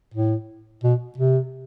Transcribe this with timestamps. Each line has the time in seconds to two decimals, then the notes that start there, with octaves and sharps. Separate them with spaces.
0.14 A2
0.84 B2
1.18 C3